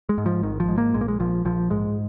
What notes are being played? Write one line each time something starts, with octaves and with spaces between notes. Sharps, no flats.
G#3
G#2
F3
G#1 D#3
F3
G#2
A#3
A#1 G#3
A#3
G#3
A#1 F3
A#1 F3
G#2 G#3